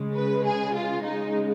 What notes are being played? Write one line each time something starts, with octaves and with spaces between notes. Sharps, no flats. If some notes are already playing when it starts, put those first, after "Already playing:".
Already playing: C#3 G#3
B4
G#4
F4
C#3 G#3 D#4